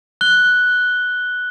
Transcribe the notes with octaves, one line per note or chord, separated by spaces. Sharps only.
F#6 G7